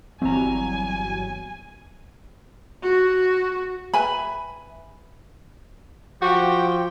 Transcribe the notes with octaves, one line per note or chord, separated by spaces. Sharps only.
G1 E2 F#3 G3 C4 G#5 A#5
F#4
B4 E5 G#5 B5
F3 F#4 G4 G5